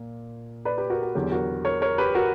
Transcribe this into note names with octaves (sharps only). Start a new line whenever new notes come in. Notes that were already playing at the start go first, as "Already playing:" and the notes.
Already playing: A#2
B4 D5
G4 B4
F#4 A#4
F#4
E2 D3 F#3 G4
F#4 A#4
A#4 C#5
A#4 C#5
G4 B4
F#4 A#4